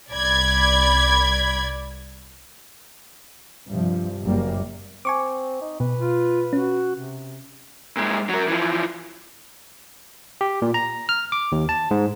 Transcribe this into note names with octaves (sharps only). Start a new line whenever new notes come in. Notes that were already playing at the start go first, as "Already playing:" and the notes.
C2 D5 B5 G#6
G2 C3 F3
F#1 F#2 G3 A#3
C4 G#5 C#6 D6
D#4
B2 B4
F4
C#4 F#4
C3
A#2 G#3
F#3 A#4
E3 F3
G4
A#2
A#5
F6
D6
D#2
A5
G#2